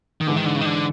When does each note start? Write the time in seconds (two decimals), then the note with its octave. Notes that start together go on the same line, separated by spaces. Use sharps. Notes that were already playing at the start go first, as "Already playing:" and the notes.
0.21 D#3
0.26 G#2 D3 E3 G#3
0.36 D#3
0.46 D3
0.56 C#3
0.61 D#3
0.66 D3